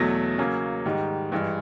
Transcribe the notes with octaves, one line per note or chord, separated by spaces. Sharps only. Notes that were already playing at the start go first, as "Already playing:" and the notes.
Already playing: E2 B2 F#3 A3 A#6
C#3 F#3 A#3 C#4
G#2 D#3 G3
G2 E3 G#3